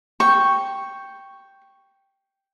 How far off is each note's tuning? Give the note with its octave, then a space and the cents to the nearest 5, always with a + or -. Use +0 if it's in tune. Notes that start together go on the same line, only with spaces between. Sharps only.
G5 +0 C#6 +0